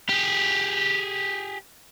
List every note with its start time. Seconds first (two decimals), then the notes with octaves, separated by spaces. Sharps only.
0.09 G4 G#4